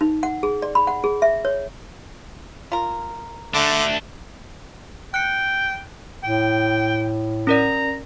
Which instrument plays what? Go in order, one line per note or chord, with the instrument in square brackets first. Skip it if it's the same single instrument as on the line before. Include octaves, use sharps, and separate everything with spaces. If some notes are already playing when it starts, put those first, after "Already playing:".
[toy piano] D#4
F#5
G#4
D5
B5
F#5
G#4
E5
C#5
[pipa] F4 A#4
[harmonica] D3 [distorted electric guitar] A3 D4 [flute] E5
[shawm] G5 [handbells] F#6 C#7
[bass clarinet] A2 [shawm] G5
[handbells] C#4 A#4 D5 [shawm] A#5